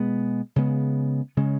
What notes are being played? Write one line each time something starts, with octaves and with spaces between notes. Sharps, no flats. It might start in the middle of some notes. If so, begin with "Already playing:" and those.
Already playing: B2 G#3 B3
C#3 G#3 B3
C#3 G#3 C#4